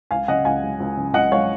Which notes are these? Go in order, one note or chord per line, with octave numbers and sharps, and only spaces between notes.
C#2 F5 G#5
C#3 D#5 F#5
C#2 F5 G#5
G#3
C#2
C#3
C#2 D#5 F#5
G#3 C#5 F5